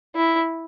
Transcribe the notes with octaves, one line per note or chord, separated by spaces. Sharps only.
E4